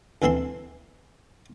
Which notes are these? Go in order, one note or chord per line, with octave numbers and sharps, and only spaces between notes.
D2 E3 C4 E4 C6